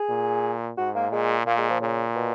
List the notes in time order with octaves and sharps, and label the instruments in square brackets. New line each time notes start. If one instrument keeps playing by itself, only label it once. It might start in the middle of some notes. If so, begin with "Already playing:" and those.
Already playing: [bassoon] G#4
[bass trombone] A#2
[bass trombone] G#2 [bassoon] F#4
[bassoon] A#3
[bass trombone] A#2 [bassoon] G#3
[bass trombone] A#2 [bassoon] A#3
[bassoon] G#3
F3
[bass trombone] A#2 [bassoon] C#3
[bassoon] B2